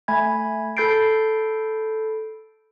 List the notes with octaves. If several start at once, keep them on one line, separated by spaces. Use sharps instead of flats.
A3 G#5 B5 G#6
A4 B5 G6 A6 C7 D7